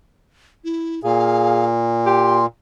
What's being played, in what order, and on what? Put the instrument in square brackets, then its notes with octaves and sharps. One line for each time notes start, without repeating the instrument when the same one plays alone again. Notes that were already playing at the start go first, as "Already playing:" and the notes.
[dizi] E4
[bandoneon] A#2 [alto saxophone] G#4 [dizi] F5
[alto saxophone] G4 [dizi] C6